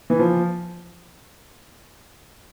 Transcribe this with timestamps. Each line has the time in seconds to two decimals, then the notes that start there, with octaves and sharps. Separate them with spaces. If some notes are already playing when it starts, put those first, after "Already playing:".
0.10 E3
0.19 F3